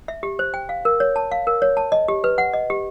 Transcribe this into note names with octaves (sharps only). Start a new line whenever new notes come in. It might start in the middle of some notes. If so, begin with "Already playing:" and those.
E5
G4
C5
G5
F5
A#4
C#5
A5
F5
A#4
C#5
A5
D#5
G4
B4
F#5
D#5
G4